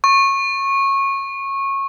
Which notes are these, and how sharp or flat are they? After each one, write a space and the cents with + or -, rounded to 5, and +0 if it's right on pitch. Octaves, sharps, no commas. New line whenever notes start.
C#6 -20